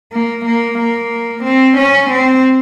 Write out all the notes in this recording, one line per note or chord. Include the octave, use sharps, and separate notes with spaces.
A#3
A#3
A#3
C4
C#4
C4